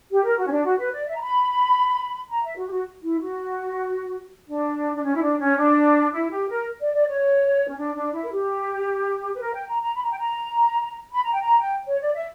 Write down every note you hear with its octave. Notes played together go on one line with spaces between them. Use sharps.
G4
A#4
F#4
C#4
D4
F#4
B4
D5
E5
A#5
B5
A#5
E5
F#4
G4
F#4
E4
F#4
D4
D4
C#4
E4
D4
C#4
D4
E4
G4
A#4
D5
D5
C#5
C#4
D4
D4
E4
A#4
G4
B4
A#4
G5
A#5
A#5
B5
A#5
G5
A#5
B5
A#5
G5
A#5
G5
C#5
D5
E5